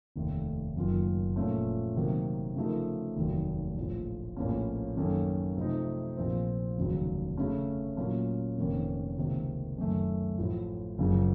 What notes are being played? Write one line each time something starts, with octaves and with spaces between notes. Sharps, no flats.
F1 D#2 D#3 A3
F#1 F#2 D#3 A#3 F4
A#2 F3 A3 C#4
C3 D#3 F#3 A#3
C#3 F3 A3 D#4 A#4
F1 D#2 D#3 F#3
A#1 A2 F3
A#1 A2 F3 A#3 C#4
F#2 D#3 A#3 C#4 A4
C3 F3 A3 C4 D#4
A#1 A#2 F3 C4
F1 D#2 C#3 F#3
C#3 A3 C#4
A#2 F#3 A#3 C#4
F1 F2 D#3 A#3 C#4
C#2 C3 D#3 A#3
F#2 D#3 A3
A1 A2 F3
F#1 F#2 C#3 F3